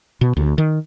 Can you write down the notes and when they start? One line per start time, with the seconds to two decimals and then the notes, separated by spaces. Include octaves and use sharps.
0.21 B2
0.37 D2
0.58 D#3